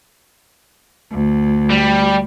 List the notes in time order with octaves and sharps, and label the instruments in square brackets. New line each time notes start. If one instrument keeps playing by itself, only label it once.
[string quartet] D2
[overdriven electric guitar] G3